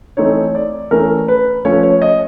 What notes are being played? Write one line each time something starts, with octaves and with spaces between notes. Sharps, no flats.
E3 A3 C4 D#4 C#5
D5
E3 A3 C#4 A#4
B4
F3 A3 C#4 C#5
C#5
D#5